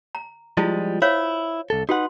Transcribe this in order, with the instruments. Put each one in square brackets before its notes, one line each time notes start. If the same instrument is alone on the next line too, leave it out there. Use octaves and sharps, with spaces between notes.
[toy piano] A#5
[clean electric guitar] F3 G3 G#3 [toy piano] E4 F4
[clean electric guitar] E4 [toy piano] C5 C#5 F5
[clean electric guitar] C2 A4
[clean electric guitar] D#4 B4 F#5 [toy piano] F#4 C6